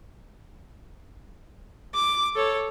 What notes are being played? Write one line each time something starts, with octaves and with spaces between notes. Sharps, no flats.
D6
A4 C#5